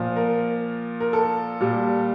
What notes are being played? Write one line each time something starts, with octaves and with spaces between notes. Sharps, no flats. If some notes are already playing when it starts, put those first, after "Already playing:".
Already playing: A#2 F3
A#4
A#4
A4
A#2 G3